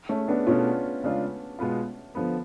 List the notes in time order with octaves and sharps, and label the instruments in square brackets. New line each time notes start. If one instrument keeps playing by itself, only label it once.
[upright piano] A3 C#4
B3 D4
[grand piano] B2 A3 D4 [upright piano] C#4 F4
[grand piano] C#3 G#3 D4 F4
B2 G#3 B3 F4
D3 F3 B3